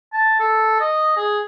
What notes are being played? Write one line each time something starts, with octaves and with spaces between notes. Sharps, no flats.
A5
A4
D#5
G#4